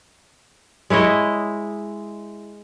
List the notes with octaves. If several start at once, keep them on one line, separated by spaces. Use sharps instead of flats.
G#3 E4 C#5 D#5